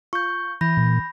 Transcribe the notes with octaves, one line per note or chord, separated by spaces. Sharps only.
F4 C#6 G6
E3 B5 G6 A#6
A#2